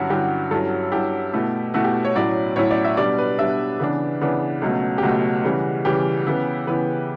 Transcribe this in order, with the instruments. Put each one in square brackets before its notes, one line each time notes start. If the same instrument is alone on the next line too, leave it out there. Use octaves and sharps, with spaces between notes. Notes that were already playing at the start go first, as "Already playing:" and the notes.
Already playing: [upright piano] G2 D3 F#3 C#4 E4 F#4
G2 D3 F#3 C#4 E4 G4
G2 F#3 C#4 E4 A4
G2 F#3 C#4 E4 G4
B2 A3 E4
B2 A3 E4 F#4
G4
C#5
A2 F#3 C#4 E4 D5
A2 F#3 C#4 E4 C#5
D5
E5
B2 G3 D4 D5
B4
B2 G3 D4 E5
C#3 E3 B3 D4
C#3 E3 B3 D4
C#2 B2 F#3 A3
G4
C#2 B2 F#3 A3 F#4
C#3 E3 G3
C#3 E3 G3 G4
C#3 E3 B3 E4
C#3 E3 B3 E4 B4